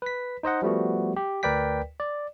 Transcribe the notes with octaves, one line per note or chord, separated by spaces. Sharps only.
B4 B6
D#4 C5 D#5 F#5
F3 G3 A3 B3 F#4
G4
D2 A#4 B4 D5 G5 B6
D5